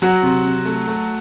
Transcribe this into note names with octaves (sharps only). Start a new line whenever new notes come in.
F#3 F#4
C3
C3
A3
A3